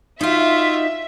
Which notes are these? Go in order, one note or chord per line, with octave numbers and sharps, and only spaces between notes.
D#4 F4 F#4 E5